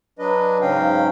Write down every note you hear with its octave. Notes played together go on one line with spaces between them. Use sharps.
F#3 D4 B4 D#5
G#2 C#3 F#3 C#4 F5 G5